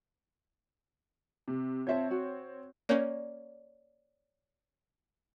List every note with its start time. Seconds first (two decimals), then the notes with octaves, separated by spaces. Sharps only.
1.48 C3
1.87 C4 F4 C#5 E5 A5
2.11 F#4
2.89 A#3 C#4 C#5 D5